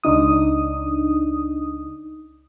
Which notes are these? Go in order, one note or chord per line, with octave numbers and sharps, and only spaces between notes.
C#2 D4 D#4 D#6